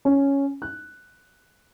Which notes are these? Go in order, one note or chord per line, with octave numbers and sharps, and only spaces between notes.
C#4
F#6